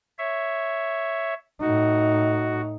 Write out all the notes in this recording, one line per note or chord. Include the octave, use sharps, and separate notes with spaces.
C#5 E5
A2 D#4 F#4